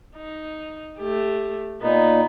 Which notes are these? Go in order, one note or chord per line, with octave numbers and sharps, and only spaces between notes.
D#4
A3 G4
A#2 B3 D#4